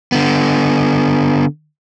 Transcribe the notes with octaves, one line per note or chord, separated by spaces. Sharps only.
D3 B3